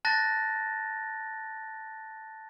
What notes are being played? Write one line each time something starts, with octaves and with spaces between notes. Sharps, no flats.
A5 F#6 A6 A#6